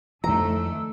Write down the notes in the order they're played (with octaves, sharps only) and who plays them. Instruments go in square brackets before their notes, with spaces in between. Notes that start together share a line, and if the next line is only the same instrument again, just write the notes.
[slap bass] F2 D#3 E3 [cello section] A3 D4 [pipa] A#5 [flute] E6